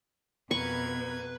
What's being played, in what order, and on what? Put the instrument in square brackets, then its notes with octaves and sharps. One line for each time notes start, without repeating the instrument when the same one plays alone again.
[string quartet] F2 A#4 G#6 [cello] B2 [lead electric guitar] B4 [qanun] C#6